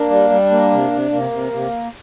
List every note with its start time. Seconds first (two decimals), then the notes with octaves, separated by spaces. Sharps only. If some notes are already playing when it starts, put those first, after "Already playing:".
Already playing: A#3 D4
0.10 G3
0.30 G3
0.51 A#3
0.71 C3
0.91 C3
1.11 C3 A#3
1.31 C3
1.52 C3